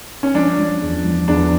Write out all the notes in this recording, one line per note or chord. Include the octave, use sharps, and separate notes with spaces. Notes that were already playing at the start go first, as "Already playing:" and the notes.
C#4
F3 D4
F3
E2
F3
E2 D4